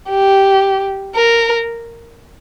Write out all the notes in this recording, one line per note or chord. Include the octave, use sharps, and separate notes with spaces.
G4
A#4